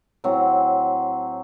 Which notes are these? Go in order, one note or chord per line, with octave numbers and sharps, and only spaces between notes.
A2 F#3 C4